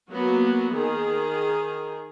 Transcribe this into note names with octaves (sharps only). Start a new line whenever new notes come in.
F#3 A#3 B3 F#4
D#3 G#4